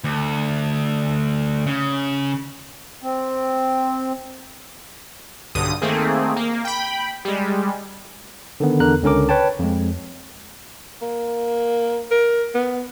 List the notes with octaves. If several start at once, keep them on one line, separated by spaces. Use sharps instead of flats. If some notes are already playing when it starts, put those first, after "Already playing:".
D2
C#3
C4
B1 G2 D3 D#6 D#7
D#3 A3 A#3 C4 G#4
A#3
G5 B5
G3 G#3
D3 D#3 B3
E2 D3 A#4 A#5 F#6
C#2 D3 C#4 A#4 D6
B4 C#5 G5 A5
F2 G#3
A#3
A#4
B3